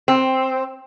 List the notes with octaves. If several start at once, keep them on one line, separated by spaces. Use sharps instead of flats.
C4